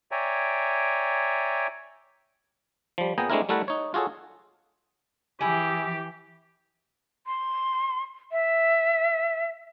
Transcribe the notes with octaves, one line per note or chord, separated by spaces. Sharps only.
C#5 D5 E5 G5 G#5 A#5
F3 G3
A#2 B3 G#4 G5 A#5
G#3 A3 C4 D4 E4 A#4
G3 A3 E4 A#4 F#5 A5
D#4 C#5
F4 F#4 G#4 A4 C#5
E3 E4 G4 G#4
C6
E5